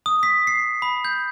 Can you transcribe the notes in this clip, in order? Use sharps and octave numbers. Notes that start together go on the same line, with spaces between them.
D#6
B6
C7
B5
G6